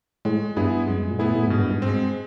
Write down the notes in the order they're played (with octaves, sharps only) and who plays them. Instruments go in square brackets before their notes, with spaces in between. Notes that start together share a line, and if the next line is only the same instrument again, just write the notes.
[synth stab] A2 [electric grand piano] G#3
[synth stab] G2 [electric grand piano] B3 E4 G#4
[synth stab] F#2 [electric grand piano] G#3
[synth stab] A#2
[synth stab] A2 [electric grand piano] B3 E4 G#4
[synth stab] A2
[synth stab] G#2 [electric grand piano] B2
[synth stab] G2
G#2
[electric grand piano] G#3 C4